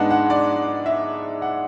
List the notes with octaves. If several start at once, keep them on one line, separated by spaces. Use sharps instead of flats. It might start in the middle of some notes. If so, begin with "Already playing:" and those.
Already playing: G#2 G#3 B3 D4 F#5 A5
F#5
D5
E5
F#5